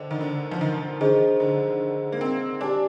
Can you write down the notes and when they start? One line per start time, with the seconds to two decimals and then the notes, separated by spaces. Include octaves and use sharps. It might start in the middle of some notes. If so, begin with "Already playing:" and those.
Already playing: D3 C5 D#5 G5 D6
0.11 D#3
0.21 D3
0.51 F3
0.61 D#3
1.01 D#3 D4 G#4 C5 D#5
1.40 D3
2.12 A#3
2.21 C4
2.61 D4 G4 D5 G#5 D6